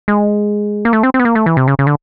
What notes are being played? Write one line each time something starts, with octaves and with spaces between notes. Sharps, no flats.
G#3
A#3
A3
C4
C4
B3
A#3
A3
E3
C3
C#3
C#3
D3